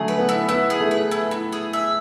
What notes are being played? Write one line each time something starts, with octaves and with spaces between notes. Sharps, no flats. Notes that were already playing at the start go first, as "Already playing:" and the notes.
Already playing: D3 F#3 A3 G#4
B4
B3
E4
B3 E4
G#4
A3
B4
E4
E4
G#4
E5